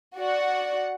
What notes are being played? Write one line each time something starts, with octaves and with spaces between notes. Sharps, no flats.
F#4 D5 F#5